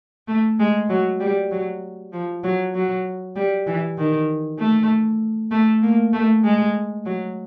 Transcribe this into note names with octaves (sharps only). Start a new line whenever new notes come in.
A3
G#3
F#3
G3
F#3
F3
F#3
F#3
G3
E3
D#3
A3
A3
A#3
A3
G#3
F#3